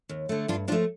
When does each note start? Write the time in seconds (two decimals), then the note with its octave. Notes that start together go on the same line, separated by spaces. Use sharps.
0.09 D#2
0.29 D3 A3
0.48 G2 D4 F4
0.68 F3 D4 F4
0.72 A3